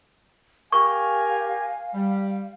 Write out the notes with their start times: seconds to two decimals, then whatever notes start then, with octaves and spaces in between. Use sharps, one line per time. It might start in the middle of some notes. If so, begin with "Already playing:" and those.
0.72 G4 A#4 F5 G#5 C#6
1.94 G3